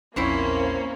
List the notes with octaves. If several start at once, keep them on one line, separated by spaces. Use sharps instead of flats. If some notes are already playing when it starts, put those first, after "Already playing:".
A#1 E2 A#3 C4 C#4 E4 C5 C#6